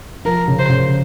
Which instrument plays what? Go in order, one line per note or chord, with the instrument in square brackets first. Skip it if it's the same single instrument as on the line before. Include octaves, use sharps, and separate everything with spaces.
[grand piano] F3 [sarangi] A#4
[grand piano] C#3
[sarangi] C5
[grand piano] C#3